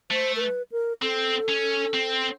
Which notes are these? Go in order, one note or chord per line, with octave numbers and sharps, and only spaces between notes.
A3 C5
A#4
B4
A#4
C4 A4
C#4
C4